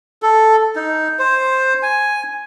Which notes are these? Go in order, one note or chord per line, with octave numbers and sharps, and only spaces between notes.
A4
D#4
C5
G#5